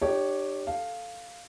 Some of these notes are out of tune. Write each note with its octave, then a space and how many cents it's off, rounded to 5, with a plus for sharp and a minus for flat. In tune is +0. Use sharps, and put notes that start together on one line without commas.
D4 +45 G4 +0 C#5 +0
A4 +0 F5 +0